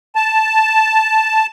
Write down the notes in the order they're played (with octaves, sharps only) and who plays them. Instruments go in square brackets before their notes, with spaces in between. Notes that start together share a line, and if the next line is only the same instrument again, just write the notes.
[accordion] A5